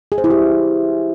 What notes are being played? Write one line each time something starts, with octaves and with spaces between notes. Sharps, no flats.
G#4
C5
E4
G4